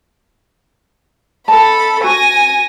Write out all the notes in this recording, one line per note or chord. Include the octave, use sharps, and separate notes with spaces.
A4 D#5 A5 B5
F#4 G#5 A#6